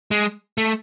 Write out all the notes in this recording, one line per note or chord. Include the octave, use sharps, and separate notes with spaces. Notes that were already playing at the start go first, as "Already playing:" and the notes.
G#3
A3